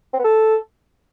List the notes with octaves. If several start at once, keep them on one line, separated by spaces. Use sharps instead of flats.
C4
B3
A4